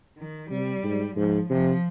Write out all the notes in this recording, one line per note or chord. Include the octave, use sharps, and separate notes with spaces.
D#3
C3 G3
G#2
G#2 F3
C3 F3